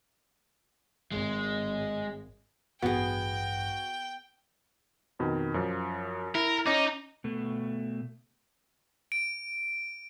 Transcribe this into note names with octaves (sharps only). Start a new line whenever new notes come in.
G#1 G#3
A1 G2 B3 F#4 G#4 G5
F2 B2 D#3
F#2 F3
E4 A#4
C#4 D#4 D#5 D6
B2 A3
D7